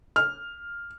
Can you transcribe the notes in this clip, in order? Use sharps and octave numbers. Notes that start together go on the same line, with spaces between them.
F6